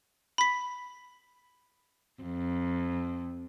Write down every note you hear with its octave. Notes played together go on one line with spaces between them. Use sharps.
B5 B6
F2